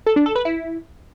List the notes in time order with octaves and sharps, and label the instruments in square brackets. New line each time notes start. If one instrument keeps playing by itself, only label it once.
[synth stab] A4
D4
A4
B4
E4